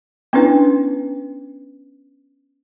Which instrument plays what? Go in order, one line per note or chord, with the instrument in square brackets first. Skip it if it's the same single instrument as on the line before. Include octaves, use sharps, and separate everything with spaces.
[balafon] B3 C#4 D4 E4 B4